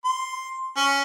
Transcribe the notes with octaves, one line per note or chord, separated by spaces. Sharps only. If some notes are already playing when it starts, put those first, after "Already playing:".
C6
C#4